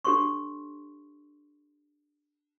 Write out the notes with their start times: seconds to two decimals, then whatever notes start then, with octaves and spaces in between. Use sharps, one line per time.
0.05 D4 G4 A4 C#5 C6 C#6